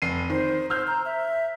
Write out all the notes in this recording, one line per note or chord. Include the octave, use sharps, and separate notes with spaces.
F1 C7 D#7
D#3 C5
C5 E6 F6 G6
A#5
E5